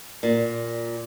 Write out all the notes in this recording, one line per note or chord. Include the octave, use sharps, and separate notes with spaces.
A#2